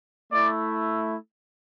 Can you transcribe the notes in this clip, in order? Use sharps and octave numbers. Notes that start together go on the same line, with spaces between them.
A3 E4 D5